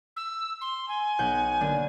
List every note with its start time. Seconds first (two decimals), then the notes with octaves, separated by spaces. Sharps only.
0.16 E6
0.61 C6
0.88 G#5
1.19 B1 F#5 G6
1.61 D3 A#3 D4